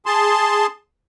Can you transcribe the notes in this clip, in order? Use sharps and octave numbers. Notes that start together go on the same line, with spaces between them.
G#4 A5 C6